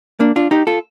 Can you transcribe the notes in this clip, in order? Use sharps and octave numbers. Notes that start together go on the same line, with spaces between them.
A#3 D4
D4 F4
D#4 G4
F4 A4